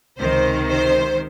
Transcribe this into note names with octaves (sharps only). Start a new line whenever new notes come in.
C#2 C3 D#3 C5
C5